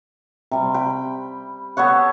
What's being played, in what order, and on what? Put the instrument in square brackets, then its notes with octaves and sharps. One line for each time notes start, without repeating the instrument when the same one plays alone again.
[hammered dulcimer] C3 G3
G5 B5
B3 A4 C#5 F#5